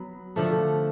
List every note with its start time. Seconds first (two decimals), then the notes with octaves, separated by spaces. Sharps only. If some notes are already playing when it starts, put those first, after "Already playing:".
Already playing: F#3 B3
0.36 D3 F3 A3